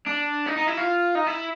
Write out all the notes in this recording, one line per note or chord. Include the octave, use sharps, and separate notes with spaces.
D4
D#4
D#4
E4
F4
D#4
E4